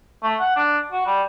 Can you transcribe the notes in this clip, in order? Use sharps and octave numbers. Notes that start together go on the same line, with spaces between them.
A3
F#5
D4
F#4
G3